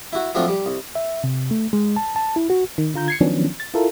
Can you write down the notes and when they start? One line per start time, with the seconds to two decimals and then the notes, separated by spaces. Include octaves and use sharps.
0.13 E4 F#4
0.35 F3 F#3 A3 C4 D4 F4
0.48 G3
0.66 C2
0.95 E5
1.24 C3
1.51 A3
1.73 G#3
1.96 A5
2.16 A5
2.36 E4
2.50 F#4
2.78 D#3
2.94 D3 F4 A#5 G6
3.08 G#6 C7 C#7
3.21 D#3 F3 F#3 B3 C#4 D4
3.60 A6
3.74 E4 F4 A4 A#4